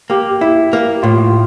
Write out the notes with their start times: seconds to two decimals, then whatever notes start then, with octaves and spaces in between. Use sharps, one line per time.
0.10 A#3 G4
0.41 E4
0.73 A#3
1.03 A2 F4